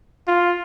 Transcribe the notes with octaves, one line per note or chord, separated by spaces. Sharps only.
F4